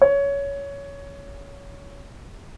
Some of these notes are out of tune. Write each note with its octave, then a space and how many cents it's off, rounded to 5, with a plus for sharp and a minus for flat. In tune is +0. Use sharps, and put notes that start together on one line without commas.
C#5 +15